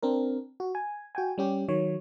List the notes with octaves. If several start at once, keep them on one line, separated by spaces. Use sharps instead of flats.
C4 D4 A#4
F#4
G#5
F#4 G5 G#5
G3 C#4 G4
D#3 F#3 C#5